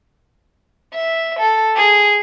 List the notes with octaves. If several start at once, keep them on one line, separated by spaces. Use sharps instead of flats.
E5
A4
G#4